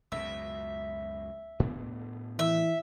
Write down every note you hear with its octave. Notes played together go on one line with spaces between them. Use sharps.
C#2 F#2 B2 E5
A2 B3 D4
E3 E5